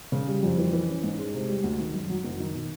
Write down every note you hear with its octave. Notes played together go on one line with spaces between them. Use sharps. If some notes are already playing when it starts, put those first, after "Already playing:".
C#3
G3
F2
E3
E3
C#4
G#2
G#3
C3
G3
D2
D#3
F#2
F#3
F#1
D#3
B2